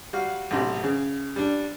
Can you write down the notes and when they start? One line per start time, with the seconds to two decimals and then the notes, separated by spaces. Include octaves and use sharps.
0.13 G3 F#4 F5
0.51 B1 A2 C3
0.84 C#3
1.36 G3 D4